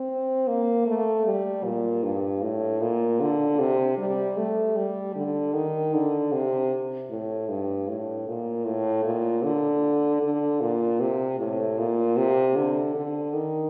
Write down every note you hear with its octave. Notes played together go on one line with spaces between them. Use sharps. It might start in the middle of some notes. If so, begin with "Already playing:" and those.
Already playing: C4
A#3
A3
G3
A#2
G2
A2
A#2
D3
C3
G3
A3
G3
D3
D#3
D3
C3
A2
G2
A2
A#2
A2
A#2
D3
D3
A#2
C3
A2
A#2
C3
D3
D3
D#3